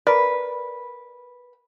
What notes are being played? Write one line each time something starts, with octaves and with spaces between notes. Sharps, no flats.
A#4 B4 D5